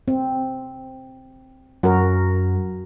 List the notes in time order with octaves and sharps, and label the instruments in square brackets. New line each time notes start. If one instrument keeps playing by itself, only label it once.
[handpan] C4
[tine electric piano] F#2 [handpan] F#4 A#4